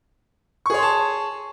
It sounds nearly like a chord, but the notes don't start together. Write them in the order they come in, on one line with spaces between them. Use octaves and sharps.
C#6 G#4 C#5 C6 A5